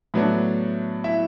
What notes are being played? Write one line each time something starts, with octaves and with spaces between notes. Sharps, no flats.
A2 F#3 B3 D4
E4 E5